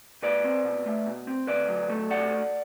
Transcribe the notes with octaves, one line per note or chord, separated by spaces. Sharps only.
B2 B4 D5
C4
B2
A3
B2
C4
D2 B4 D5
F#3
A3
C3 D5 F#5